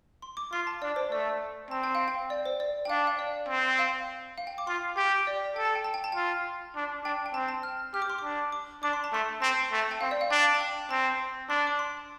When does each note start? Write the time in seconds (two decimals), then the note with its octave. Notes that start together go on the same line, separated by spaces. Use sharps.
0.22 C6
0.37 D6
0.52 F4 C6
0.67 A5
0.82 D4 D5
0.96 C5
1.11 A3 D5
1.70 C4 A5
1.83 G5
1.95 F5
2.08 G5
2.30 D5
2.46 C5
2.60 D5
2.85 G5
2.89 D4 F5
3.07 F5
3.19 D5
3.48 C4
3.79 F5
4.38 F5
4.47 G5
4.58 D6
4.67 F4 C6
4.96 G4 G5
5.27 D5
5.56 A4 G5
5.65 A5
5.75 G5
5.84 A5
5.94 G5
6.04 A5
6.12 F4 G5
6.76 D4
7.04 D4 G5
7.26 G5
7.34 C4 A5
7.49 A5
7.63 F6
7.94 G4 F6
8.02 D6
8.10 C6
8.19 D6
8.24 D4
8.52 D6
8.83 D4 D6
8.93 C6
9.04 A5
9.12 A3 C6
9.42 C4 A5
9.72 A3
9.82 A5
9.91 G5
10.01 C4 F5
10.11 D5
10.21 F5
10.31 D4 G5
10.55 A5
10.61 G5
10.91 C4 A5
11.49 D4 C6
11.67 D6
11.79 C6